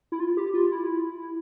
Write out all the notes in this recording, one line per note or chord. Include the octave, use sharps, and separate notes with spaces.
E4
F4
G4
F4
E4